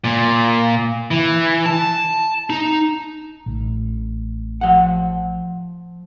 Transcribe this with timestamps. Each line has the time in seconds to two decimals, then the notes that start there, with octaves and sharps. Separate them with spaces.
0.04 A#2
1.11 E3
1.66 A5
2.50 D#4
3.46 A1
4.61 F3 F#5